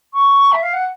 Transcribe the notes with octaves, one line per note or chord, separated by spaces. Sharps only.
C#6
E5
F5
F#5